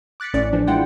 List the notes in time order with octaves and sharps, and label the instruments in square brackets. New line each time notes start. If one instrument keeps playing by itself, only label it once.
[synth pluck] D6 F#6 A6 B6 C#7
A1 A2 A3 C#4 D5
E3 F3 D4
G#3 E4 F4 F#5 G5